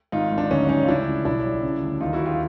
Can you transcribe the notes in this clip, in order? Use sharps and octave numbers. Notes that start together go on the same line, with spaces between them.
G#1 D#4 F4
G#1
D4
D2 C#4 D#4
G3 C#4 D#4
F4
C#2 D4 E4
C#3
B1 D4 E4
G3
C#3
D2
D#2 D#4 F4
E4 F#4
D#2
F4 G4